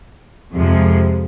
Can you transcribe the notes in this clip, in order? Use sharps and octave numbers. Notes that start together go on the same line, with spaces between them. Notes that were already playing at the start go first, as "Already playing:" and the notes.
F2 C3 F3 G#3